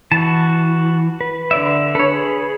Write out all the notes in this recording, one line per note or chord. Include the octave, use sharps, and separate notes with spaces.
E3 F#4 A5
B4
D3 D5 E5
A4 B4 C#5
G#4